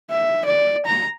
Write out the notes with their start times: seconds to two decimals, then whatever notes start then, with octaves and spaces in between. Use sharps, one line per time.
0.10 E5
0.45 D5
0.86 A#5